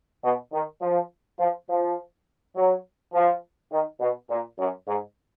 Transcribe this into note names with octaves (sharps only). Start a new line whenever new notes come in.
B2
D#3
F3
F3
F3
F#3
F3
D#3
B2
A#2
F#2
G#2